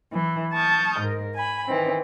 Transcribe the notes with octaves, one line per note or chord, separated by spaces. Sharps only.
E3
A5 C#6 D#6 F6 G6 A6
G#2 A#4
G#5 B5
D#3 E3 C4